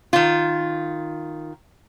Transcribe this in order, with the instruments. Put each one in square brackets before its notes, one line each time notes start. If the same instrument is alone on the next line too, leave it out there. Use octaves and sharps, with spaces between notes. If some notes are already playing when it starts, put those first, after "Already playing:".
[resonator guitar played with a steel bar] D#3 F4